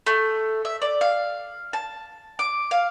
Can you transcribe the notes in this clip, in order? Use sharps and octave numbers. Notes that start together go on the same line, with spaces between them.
A3
E5
D5
F5
A5
D6
F5